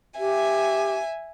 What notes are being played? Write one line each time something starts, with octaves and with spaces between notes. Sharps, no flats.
G4 E5 G#5